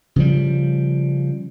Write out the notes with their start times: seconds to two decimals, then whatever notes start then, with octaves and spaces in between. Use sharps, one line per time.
0.16 C#3 F3 G3